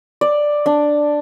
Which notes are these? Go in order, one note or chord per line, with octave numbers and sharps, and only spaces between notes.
D5
D4